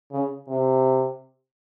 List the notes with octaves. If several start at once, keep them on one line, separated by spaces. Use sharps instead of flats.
C#3
C3